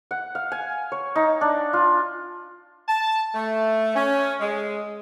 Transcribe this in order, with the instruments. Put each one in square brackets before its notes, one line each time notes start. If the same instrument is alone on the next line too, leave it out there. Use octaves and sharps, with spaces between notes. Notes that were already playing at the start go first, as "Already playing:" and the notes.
[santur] F#5
F5
G#5
C#5
D#4
D4
F4
[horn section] A5
A3
C#4
G#3